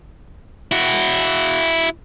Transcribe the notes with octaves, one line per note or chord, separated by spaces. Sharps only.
E4 F#4